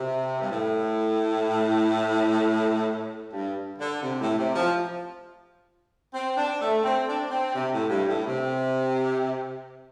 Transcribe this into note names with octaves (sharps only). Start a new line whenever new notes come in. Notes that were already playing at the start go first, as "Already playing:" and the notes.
Already playing: C3
G2
A2
G2
D3
C3
A2
C3
F3
C4
D4
A3
C4
D4
C4
C3
A2
G2
A2
C3